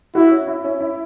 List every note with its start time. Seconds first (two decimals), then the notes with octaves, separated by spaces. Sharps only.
0.15 E4 F#4
0.31 C#4
0.47 E4
0.64 C#4
0.81 E4